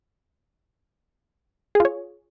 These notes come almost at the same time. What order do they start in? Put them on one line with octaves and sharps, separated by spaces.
G#4 F4 C#5